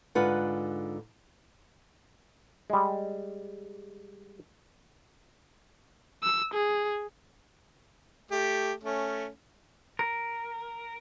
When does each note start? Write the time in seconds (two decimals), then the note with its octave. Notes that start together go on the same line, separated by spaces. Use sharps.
0.15 G#2 D3 F4 B4 F#5
2.70 G3 G#3
6.23 E6
6.53 G#4
8.31 A3 G4
8.84 A3 C#4
9.99 A#4